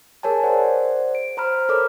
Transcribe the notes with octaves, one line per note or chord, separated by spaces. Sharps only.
G#4 A#4 C#5 G#5 A5
C5 D5 F#5
D7
C5 A#5 B5 F6
A4 A#4 C#5 A#5 D6 F6